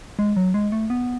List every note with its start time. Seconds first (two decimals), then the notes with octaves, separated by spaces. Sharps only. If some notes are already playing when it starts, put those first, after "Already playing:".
0.19 G#3
0.36 F#3
0.54 G#3
0.72 A3
0.90 B3